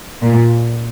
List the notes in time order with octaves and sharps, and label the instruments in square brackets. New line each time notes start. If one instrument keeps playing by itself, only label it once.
[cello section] A#2